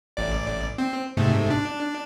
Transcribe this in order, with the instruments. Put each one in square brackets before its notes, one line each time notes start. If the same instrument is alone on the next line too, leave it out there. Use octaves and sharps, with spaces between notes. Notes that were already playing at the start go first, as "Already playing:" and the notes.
[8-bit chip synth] A1 D5
C4
G#2 C3 A3
D4